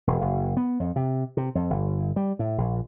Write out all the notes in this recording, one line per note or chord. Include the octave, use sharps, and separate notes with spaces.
E1
F#1
B3
F2
C3
C3
F2
G1
G3
A2
A#1